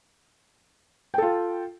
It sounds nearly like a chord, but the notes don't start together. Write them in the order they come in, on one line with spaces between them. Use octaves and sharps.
G5 A4 F4